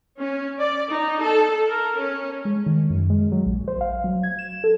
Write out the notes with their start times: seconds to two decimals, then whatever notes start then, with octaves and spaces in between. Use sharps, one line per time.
0.19 C#4
0.59 D5
0.92 D#4
1.22 A4
1.69 A#4
2.01 C#4
2.45 G#3
2.66 D#3
2.90 F#2
3.10 G#3
3.32 F#3
3.46 A#1
3.68 C5
3.81 F5
4.04 F#3
4.23 G#6
4.39 E7
4.64 A4